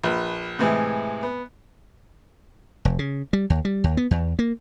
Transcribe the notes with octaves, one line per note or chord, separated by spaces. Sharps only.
A#1 B4 F#6
A2 C3 E3 G#3
B3
F1
C#3
G3
D#2
G3
D#2
B3
E2
A#3